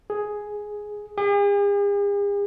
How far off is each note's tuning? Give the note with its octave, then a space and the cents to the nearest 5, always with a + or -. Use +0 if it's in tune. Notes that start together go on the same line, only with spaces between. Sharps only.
G#4 +5
G#4 -45